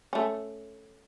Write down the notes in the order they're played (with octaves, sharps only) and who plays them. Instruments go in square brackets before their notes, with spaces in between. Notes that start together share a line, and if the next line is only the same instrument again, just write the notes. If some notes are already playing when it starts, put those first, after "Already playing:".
[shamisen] A3 C#4